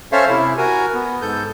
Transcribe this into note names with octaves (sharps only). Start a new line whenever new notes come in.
C#4 A4 C5 C#5 E5 F5
C3 E4
F#4 A#4 G#5
B3
G#2 A4 G6